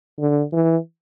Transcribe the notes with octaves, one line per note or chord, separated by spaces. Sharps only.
D3
E3